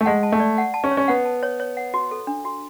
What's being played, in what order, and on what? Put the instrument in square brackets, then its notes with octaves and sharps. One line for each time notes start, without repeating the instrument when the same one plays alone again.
[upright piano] A3
[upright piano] G#3 [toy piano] F#5
[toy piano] A5
[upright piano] A3
[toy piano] D5
F#5
A5
[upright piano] C#4
[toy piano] C#5
[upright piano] C#4
[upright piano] B3 [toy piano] F#5
[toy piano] A5
C#5
C#5
F#5
F#4
A4
D4
F#4